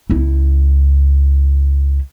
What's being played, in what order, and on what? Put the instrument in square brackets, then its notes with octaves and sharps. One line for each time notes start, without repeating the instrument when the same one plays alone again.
[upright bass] C#2 E4